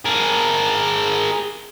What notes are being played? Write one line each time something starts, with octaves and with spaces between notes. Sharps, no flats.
G#4 A#4